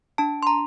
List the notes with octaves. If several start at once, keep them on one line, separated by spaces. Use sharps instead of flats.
D4 A5
C6
A#5